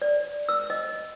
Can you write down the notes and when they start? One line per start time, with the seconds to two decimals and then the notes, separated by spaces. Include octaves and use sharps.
0.02 D5
0.49 E6
0.70 D#5